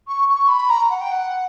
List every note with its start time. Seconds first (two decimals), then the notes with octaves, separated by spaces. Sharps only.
0.08 C#6
0.28 C#6
0.48 B5
0.69 A#5
0.90 F#5
1.01 G5
1.12 F#5